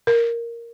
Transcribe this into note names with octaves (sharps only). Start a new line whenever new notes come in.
A#4